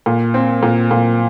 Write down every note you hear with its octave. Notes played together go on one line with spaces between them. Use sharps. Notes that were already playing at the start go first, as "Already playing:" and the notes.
A#2
C4
A#2
A#2